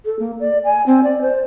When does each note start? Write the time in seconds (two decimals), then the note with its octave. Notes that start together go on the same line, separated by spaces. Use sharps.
0.05 A4
0.19 A#3
0.40 D5
0.64 G#5
0.86 C4
1.04 D5
1.22 C5